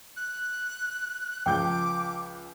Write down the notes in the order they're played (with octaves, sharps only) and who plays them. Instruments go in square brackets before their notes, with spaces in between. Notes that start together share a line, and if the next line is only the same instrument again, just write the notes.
[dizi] F#6
[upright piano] C#2 F3 G6 [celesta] G5 [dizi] D6